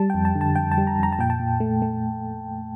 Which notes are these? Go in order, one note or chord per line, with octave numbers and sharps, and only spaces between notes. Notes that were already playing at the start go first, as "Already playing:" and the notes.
Already playing: G3 A5
F2 G5
A5
D3
A5
F2 G5
A5
G3
A#5
F2 A#5
A5
A#2 G5
A5
A#2
A3
A3